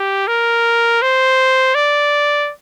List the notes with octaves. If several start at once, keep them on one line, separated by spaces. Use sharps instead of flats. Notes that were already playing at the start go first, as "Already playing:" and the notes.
Already playing: G4
A#4
C5
D5